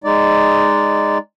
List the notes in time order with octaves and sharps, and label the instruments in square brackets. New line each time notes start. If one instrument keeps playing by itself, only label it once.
[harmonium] G#3 D#4 D5